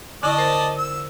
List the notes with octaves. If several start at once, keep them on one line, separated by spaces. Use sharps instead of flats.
D3 E4 D5 D#5 A5 C#6
A#4 C5
E6